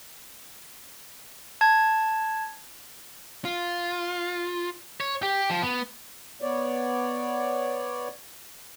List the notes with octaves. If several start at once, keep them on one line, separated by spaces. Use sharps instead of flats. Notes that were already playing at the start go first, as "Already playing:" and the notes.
A5 G#6
F4
C#5
G4
F3
B3
B3 C#5 D5